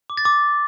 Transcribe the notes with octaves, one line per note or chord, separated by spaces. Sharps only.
D6
A6
D6